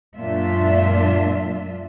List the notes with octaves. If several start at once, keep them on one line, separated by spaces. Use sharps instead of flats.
F#2 A#2 G#3 D4 F4 E5